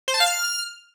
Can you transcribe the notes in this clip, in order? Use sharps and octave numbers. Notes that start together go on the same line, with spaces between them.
C5
A5
F5
F6